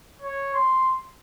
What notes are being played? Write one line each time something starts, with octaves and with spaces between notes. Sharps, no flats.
C#5
C6